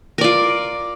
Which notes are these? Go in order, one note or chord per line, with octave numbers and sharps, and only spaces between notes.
F4 A#4 D5